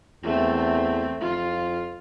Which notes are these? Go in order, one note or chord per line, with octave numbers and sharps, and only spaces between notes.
E2 A3 C4
F2 F4